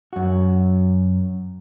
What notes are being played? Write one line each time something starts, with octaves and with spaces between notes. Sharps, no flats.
F#2 F#4